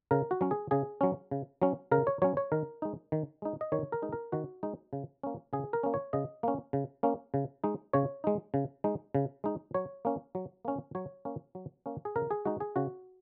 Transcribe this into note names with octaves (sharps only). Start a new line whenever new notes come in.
C#3 A#4
F#4
F#3 C#4
G#4
C#3 G#4
F#3 C#4
C#3
F#3 C#4
C#3 A#4
C#5
F#3 C#4 C#5
C#5
D#3 A#4
G#3 D#4
D#3
G#3 D#4
D#5
D#3 C#5
A#4
G#3 D#4
A#4
D#3 F#4
G#3 D#4
C#3
A#3 C#4
C#3 G#4
A#4
A#3 C#4
C#5
C#3 D#5
A#3 C#4
C#3
A#3 C#4
C#3
G#3 D#4
C#3 C#5
G#3 D#4
C#3
G#3 D#4
C#3
G#3 D#4
F#3 C#5
A#3 C#4
F#3
A#3 C#4
F#3 C#5
A#3 C#4
F#3
A#3 C#4
G#4
C#3 A#4
G#4
G#3 D#4 F#4
G#4
C#3 F#4